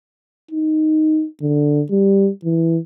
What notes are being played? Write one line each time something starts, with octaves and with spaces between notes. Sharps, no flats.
D#4
D3
G3
E3